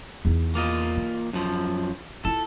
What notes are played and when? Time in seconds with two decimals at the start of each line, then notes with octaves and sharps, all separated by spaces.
0.25 E2 D#4
0.55 A#3 F4 D#5
0.97 E3
1.33 F#2 F3
2.25 E4 F4 A4